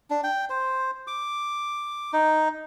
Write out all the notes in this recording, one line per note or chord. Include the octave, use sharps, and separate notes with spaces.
D4
G5
C5
D6
D#4